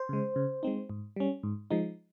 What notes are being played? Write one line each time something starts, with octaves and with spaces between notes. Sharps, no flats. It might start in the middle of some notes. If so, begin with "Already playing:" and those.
Already playing: C5
C#3 G#3
C#3
G#3 C4 D#4
G#2
G3 C#4
G#2
F3 G#3 D#4